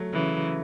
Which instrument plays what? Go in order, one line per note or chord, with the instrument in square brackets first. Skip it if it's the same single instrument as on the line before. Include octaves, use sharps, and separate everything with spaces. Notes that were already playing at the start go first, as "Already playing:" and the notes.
Already playing: [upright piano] F#3 A3
[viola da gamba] C#3 E3